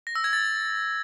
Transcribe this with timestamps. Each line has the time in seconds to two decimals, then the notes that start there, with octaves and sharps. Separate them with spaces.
0.07 A#6
0.16 E6
0.24 G#6
0.33 A6